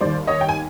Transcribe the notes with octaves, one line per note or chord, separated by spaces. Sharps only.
D#2 D#3 G3 C5 D5
C#5 D#5
G5
G#5